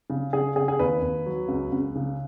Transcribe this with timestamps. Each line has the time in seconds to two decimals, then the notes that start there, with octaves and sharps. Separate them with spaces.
0.10 C#3
0.33 C#3 G#4
0.56 C#3 G#4
0.68 G#4
0.79 D#2 B4
1.02 D#2
1.26 F#3
1.48 C#2
1.72 C#2
1.96 C#3